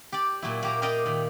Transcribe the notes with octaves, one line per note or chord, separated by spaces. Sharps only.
G4 D5
A#2 F#3 E4
A#3 G4 A#5
G4 A#4 D5 D#5 F5 G5
A#2 D#3